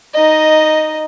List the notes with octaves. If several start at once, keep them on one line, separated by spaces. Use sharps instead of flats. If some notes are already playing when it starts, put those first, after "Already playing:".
D#4 D#5